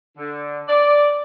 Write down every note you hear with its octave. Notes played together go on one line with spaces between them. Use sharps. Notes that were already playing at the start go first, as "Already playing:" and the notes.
D3
D5